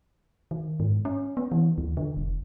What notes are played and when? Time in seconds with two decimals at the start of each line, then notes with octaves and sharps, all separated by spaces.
0.51 D#3
0.80 G#2
1.05 C#4
1.37 B3
1.52 E3
1.78 D#2
1.97 D3
2.17 F1